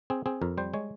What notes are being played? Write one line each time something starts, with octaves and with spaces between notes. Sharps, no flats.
C4 G#4
C4 G#4
F2 A#4
G3 C5
G#3 C#5